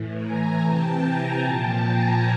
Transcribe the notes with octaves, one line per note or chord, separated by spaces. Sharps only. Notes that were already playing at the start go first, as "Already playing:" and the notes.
Already playing: A2 E3
G#5 A#5
C3 E3 G5 A5
G#5 A#5
A#2 F3 G5 A5
G#5 A#5